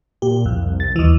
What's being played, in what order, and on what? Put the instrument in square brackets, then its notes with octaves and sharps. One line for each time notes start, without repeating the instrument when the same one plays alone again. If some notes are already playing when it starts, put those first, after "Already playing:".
[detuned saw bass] A#2 [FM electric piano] G4
[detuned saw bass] C2 [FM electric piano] F2
[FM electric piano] A6
D#2 E3